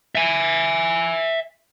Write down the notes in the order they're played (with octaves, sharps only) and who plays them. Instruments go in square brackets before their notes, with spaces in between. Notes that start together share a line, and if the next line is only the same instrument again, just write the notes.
[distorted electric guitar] E5 G#5